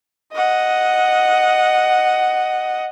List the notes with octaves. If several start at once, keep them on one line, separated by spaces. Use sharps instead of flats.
D#5 F#5